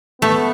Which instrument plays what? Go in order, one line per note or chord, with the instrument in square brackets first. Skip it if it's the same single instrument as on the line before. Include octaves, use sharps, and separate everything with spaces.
[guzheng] A3 [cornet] B3